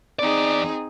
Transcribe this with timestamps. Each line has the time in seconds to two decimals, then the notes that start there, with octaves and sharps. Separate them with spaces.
0.19 E2 C4 D#4 G#4 D5